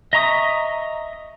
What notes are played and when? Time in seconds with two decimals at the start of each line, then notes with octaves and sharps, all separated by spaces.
0.13 D#5 E5 A#5 C#6 D#6